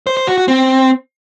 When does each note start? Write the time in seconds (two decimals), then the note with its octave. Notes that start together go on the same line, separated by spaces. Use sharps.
0.07 C5
0.17 C5
0.27 F#4
0.38 F#4
0.48 C4